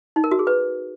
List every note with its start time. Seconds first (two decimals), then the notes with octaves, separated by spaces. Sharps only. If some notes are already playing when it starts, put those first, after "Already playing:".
0.16 D#4
0.24 A#4
0.31 F#4
0.39 G#4
0.47 B4